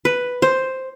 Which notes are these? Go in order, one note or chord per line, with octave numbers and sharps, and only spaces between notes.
B4
C5